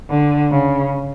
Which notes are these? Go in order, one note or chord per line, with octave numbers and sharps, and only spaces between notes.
D3
C#3